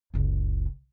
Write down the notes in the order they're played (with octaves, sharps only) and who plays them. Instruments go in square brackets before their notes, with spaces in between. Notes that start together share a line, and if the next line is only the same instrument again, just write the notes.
[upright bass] F#1 C#2